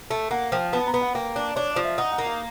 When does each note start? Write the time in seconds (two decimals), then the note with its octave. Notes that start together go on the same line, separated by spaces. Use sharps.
0.11 A3
0.31 A#3 F#5
0.52 F3 G5
0.73 B3 A5
0.87 A#5
0.94 B3
1.01 F#5
1.15 A#3 G5
1.36 D4
1.56 D4 C#5
1.71 D5
1.76 F3
1.84 E5
1.98 D#4 F#5
2.11 F#5
2.18 A#3
2.26 F5